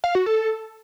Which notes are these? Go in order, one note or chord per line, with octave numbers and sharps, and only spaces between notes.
F5
F#4
A4